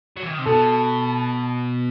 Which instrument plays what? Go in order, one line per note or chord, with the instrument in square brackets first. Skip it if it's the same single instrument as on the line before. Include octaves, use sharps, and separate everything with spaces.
[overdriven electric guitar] F#3
E3
D#3
C3
[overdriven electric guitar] B2 [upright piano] A4